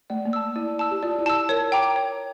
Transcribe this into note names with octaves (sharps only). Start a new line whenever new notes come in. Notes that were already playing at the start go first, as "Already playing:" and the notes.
A3 D5
A#3
A5 E6
E4 D5
E4
A5 E6
G4
F4 D5
E4
A5 E6
A#4 C#5
G5 A#5 D6
C#5